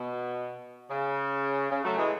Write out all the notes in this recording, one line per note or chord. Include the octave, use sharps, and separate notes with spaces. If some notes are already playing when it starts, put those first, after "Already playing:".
Already playing: B2
C#3
C#3
F#3 A3
E3 G#3